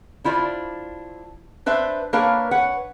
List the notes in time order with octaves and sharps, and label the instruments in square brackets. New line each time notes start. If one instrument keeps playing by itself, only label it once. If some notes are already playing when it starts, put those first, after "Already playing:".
[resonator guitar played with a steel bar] D4 E4 F4 C5 D5
D4 B4 C5 E5
A#3 D4 A#4 B4 C#5 F5
B4 C#5 F#5